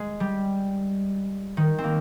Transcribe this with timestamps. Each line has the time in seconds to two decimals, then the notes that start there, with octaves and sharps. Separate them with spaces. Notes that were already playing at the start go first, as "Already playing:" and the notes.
Already playing: G#3
0.20 G3
1.57 D#3
1.78 C4
1.84 A#3